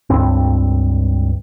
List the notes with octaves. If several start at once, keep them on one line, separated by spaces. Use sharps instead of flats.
C#2 G2 C4